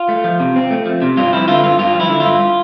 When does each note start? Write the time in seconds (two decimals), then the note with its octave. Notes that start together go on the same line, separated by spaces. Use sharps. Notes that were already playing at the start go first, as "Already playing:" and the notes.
Already playing: F4
0.09 A3
0.24 F3
0.40 C3
0.56 C4
0.71 A3
0.86 F3
1.02 C3
1.17 G2 F4
1.33 F3 E4
1.48 D3 F4
1.63 G2 F4
1.79 G2 F4
1.94 F3
2.00 E4
2.09 D3
2.20 G2 F4